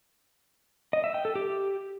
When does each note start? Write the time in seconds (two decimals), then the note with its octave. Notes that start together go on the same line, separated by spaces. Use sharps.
0.93 D#5
1.04 E5
1.14 G5
1.25 A4
1.35 G4